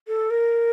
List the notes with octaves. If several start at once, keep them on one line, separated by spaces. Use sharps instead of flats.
A4
A#4